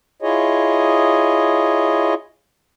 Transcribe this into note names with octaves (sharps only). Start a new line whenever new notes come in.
E4 F4 G#4 C#5 D#5